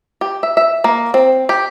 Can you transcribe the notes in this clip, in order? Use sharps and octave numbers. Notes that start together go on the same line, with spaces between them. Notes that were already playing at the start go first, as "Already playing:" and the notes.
G4
E5
E5
A#3
C4
G4